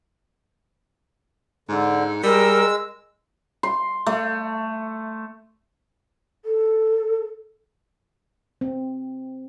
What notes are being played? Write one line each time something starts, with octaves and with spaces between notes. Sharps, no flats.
G#2 D3
G3 G#3 A#4 E6
C6
A3
A4
C4